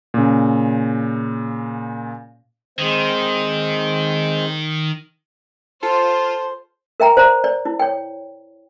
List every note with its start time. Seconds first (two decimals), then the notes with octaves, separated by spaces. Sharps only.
0.14 A#2 C#3
2.79 D#3 G#3 C4 C5
5.83 F4 A4 C5
7.00 A#4 E5 G5 A#5
7.17 C5 D5 A#5
7.44 D5
7.65 E4
7.79 C#5 G5